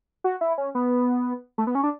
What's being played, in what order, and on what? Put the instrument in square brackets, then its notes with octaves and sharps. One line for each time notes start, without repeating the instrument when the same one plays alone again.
[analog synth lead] F#4
E4
C#4
B3
A3
B3
C#4
D4